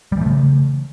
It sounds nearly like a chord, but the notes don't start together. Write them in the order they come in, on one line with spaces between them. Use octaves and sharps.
G3 E3 A3 C#3